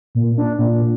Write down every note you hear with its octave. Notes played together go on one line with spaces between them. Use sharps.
A#2
D4
A#2